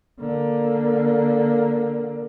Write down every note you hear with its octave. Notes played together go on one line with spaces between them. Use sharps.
D3 A#3